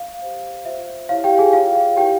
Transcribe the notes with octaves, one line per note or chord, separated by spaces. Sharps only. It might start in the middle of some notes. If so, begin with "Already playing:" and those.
Already playing: F5
G4 C5
F4 C5 E5
E4 G4 C#5 F5
G4 G5
G#4 G#5
F4 G#4 C#5 F5
F5
E4 G4 A#4 C#5 G5